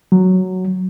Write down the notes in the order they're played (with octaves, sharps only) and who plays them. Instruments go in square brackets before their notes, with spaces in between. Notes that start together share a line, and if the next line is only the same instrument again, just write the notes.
[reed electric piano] F#3